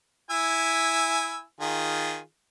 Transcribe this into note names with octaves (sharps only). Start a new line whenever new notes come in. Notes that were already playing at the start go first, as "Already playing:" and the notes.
E4 G#5 E6
D#3 F4 G#4